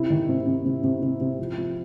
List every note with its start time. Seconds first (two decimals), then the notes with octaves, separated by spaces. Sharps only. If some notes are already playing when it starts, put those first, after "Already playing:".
Already playing: C3 E4
0.10 D#3
0.29 C3
0.47 C3
0.65 C3
0.84 C3
1.02 C3
1.20 C3
1.39 F3
1.57 F3